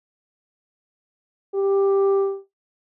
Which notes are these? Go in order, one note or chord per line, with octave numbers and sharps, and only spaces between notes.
G4